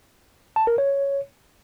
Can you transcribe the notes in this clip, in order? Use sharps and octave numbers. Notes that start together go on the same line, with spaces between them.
A5
A#4
C#5